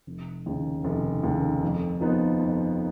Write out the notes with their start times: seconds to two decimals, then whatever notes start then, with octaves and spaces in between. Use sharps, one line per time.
0.07 F1
0.46 D#2 C#3
0.84 F1
1.23 D#2 C#3
1.63 F2
2.01 F3 B3 D#4
2.40 F2